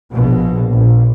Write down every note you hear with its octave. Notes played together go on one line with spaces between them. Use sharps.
A#1 B2
A#1